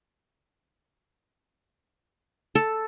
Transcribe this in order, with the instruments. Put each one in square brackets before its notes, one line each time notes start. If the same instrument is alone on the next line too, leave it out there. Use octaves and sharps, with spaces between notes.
[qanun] A4